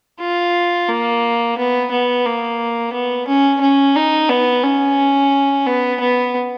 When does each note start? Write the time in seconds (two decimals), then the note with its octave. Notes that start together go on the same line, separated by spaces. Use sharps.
0.20 F4
0.89 A#3
1.58 B3
1.91 B3
2.26 A#3
2.93 B3
3.28 C#4
3.61 C#4
3.96 D#4
4.29 B3
4.64 C#4
5.66 B3
6.01 B3